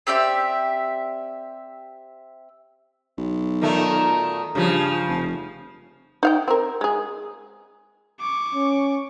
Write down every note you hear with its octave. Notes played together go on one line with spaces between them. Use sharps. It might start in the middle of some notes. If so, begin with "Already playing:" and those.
C4 G4 D5 E5
B1
A#2 D#3 A3
G2 C#3 F3
F1
D#4 F5 G5
C4 A#4
G#3 G#4
C#6 D6
C#4